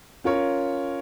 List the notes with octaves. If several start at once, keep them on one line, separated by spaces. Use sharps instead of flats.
C#4 F4 A#4 C#5